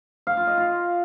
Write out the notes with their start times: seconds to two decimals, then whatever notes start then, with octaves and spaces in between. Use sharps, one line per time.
0.27 F5
0.37 F4
0.47 D#5
0.57 F4